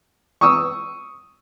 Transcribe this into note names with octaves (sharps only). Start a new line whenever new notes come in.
C#6 D#6 E6